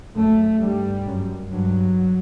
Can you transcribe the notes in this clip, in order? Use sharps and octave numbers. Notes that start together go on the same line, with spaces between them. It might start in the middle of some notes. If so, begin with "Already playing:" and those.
F#2 A3
G2 G3
F#2
G2 F#3